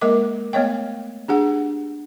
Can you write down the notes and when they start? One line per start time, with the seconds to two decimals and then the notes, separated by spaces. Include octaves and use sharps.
0.01 G#3 A#3 A#4 D#5 D6
0.53 A3 B3 C#5 D#5 G5
1.28 D4 G4 G#4 F#5